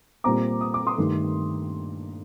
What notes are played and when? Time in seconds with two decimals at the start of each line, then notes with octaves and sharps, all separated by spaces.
0.24 A#2 G3 C4 A#5 D6
0.61 D#6
0.74 D6
0.87 C6 D#6
0.98 G2 D#3 A3